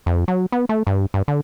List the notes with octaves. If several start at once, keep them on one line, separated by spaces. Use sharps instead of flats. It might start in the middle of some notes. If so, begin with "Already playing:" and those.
F2
F#3
B3
A3
G2
G2
D3